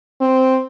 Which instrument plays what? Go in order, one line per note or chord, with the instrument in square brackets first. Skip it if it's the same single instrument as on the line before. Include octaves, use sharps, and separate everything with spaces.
[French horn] C4